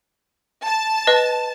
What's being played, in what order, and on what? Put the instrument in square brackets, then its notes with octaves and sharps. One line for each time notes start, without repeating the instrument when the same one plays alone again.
[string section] A5
[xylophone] B4 D#5